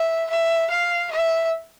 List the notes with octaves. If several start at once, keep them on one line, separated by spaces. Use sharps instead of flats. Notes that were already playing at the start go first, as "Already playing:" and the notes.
Already playing: E5
E5
F5
E5